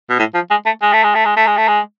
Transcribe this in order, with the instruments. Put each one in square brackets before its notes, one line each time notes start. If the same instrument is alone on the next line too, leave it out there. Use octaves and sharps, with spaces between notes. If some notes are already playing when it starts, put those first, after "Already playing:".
[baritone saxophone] B2
A2
F3
G#3
A3
G#3
A3
G#3
A3
G#3
A3
G#3
A3
G#3